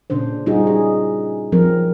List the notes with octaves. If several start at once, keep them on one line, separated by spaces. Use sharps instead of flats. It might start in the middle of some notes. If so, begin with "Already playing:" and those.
A#2 C#3 C#4 D4 C5
G3 D#4 F4 F#4 G#4
G#4
F3 F#3 C4 A#4